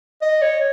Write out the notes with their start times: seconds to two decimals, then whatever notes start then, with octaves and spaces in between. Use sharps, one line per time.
0.22 D#5
0.42 C#5